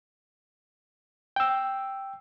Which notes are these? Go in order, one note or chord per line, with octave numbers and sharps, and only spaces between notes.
G5 E6